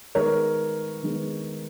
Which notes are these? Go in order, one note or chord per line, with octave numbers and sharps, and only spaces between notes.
D#3 G#3 B3 A#4 C#5
D#3 G#3 B3